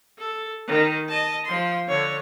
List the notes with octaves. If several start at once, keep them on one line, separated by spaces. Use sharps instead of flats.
A4
D#3
D#5 A5
F3 C6
D3 C#5